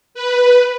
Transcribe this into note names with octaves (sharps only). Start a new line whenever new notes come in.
B4